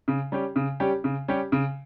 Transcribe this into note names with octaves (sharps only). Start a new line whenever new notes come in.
C#3
G3 C#4 G4
C#3
G3 C#4 G4
C#3
G3 C#4 G4
C#3